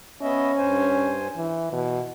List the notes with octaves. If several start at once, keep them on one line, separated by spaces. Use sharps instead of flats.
B3 C#4 D#5 E5
G2 C5 G#5
E3
B2 E3